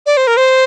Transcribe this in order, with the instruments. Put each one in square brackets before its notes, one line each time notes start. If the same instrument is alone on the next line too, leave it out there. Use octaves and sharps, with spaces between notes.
[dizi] D5
C5
A#4
C5